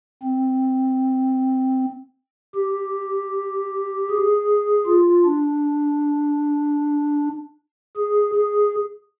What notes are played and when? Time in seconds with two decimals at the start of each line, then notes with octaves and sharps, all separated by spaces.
0.23 C4
2.54 G4
4.10 G#4
4.87 F4
5.25 D4
7.97 G#4
8.35 G#4